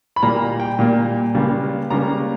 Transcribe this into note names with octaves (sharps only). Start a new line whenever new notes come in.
B5
A#2 G3 A#3 A#5
G5
A#2 G3 A#3
C#2 C#3 G3 A#3
C#2 C#3 G3 A#3 A#5